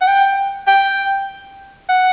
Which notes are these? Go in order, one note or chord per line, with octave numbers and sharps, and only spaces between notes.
F#5
G5
G5
F#5